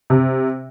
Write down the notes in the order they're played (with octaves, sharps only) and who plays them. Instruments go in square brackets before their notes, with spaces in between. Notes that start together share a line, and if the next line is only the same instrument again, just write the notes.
[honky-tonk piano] C3